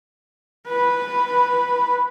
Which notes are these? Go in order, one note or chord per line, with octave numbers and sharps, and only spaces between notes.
B4 B5